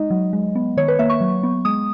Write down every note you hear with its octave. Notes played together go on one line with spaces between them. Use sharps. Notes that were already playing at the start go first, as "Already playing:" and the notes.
Already playing: G#3 D#4 D#5
F#3
G#3
B3
D#3 C#5
B4
A#3 E5
C#6
F#3
B3
G#3 D#6